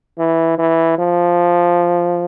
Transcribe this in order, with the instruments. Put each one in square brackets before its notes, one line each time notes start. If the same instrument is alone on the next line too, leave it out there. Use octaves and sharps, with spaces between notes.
[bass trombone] E3
E3
F3